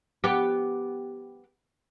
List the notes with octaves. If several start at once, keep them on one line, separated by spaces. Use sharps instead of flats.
B3 G4